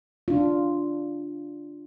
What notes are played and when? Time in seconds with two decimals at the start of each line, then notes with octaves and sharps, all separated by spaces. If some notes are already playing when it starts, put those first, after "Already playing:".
0.28 D4 F4